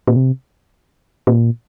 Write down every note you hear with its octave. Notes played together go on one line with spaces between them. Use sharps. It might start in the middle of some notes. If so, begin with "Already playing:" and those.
A#2
C3
A#2